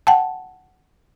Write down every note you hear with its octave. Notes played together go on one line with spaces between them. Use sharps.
F#5 G5 A5